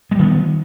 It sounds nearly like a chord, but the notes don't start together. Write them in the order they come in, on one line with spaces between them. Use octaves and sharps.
G#3 G3 D#3 B3